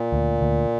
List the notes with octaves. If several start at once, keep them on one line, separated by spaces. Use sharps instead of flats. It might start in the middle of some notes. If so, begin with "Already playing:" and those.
Already playing: A#2
D2
D2